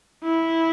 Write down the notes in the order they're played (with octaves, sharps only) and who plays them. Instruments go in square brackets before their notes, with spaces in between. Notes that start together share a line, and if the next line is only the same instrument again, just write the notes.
[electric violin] E4